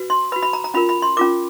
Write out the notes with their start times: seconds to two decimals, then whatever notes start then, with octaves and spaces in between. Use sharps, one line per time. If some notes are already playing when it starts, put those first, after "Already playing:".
Already playing: F#4 B4
0.10 C6
0.32 F#4 B4 B5
0.43 B5
0.53 A#5
0.64 A#5
0.74 C#4 F4 A#4 B5
0.89 B5
1.02 C6
1.17 C#4 F4 A#4 D6